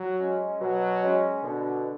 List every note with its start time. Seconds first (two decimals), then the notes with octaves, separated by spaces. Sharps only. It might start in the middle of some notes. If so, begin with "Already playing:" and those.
Already playing: F#3
0.19 G#3 C#4
0.61 B2 F#3
1.03 G#3 C#4
1.43 B2 D3